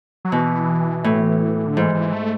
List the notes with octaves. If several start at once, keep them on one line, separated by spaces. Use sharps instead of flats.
F#3
B2 E3
A2
D3
G#2 E3
E3
A3